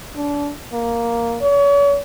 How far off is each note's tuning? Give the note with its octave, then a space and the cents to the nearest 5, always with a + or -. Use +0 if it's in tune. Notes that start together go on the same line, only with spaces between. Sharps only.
D4 -25
A#3 +0
C#5 +40